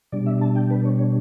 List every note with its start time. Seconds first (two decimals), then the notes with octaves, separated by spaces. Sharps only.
0.12 B2 G3 D4 D5
0.26 E5
0.41 A5
0.56 G5
0.70 B4
0.85 C#5
0.99 C#5